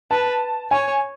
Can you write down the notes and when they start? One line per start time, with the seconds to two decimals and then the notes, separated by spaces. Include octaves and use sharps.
0.11 B4 A5
0.71 C#5 G#5